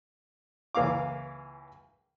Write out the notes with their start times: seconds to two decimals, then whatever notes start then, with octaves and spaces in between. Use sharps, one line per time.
0.75 C#2 E3 A#3 F5 D6